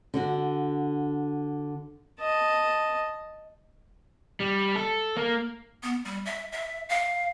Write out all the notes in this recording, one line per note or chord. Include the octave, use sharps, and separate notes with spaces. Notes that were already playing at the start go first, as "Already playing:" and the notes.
D3 D4 F#4
D#5 A5
G3
A4
A#3
B3
G3
E5
E5
F5